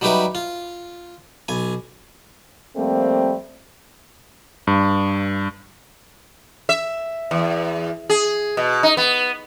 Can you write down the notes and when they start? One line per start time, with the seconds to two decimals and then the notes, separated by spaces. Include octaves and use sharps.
0.01 F#3 G3 D#4 G4 B4 E5
0.35 F4
1.48 B1 G#5
2.76 F3 G3 A3 A#3 C4
4.67 G2
6.69 E5
7.31 E2
8.10 G#4
8.57 B2
8.83 D#4
8.97 B3